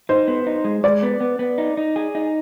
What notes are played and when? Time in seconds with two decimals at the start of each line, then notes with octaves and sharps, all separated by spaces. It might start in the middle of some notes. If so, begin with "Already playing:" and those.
0.09 D#4 C5
0.28 B3
0.47 D#4
0.65 G#3
0.84 G#3 D5
1.03 B3
1.21 B3
1.39 B3
1.58 D#4
1.77 D#4
1.96 G#4
2.15 D#4